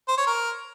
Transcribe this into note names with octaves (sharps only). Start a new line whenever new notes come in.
C5
C#5
A#4